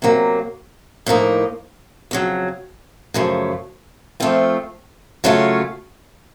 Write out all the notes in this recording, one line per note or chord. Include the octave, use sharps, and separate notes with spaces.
C3 F#3 A#3
A2 F3 A#3 D#4
F2 C#3 F#3
F#2 C#3 F3 A3
F3 A3 C4 F4
C#3 F#3 A3 C#4 F4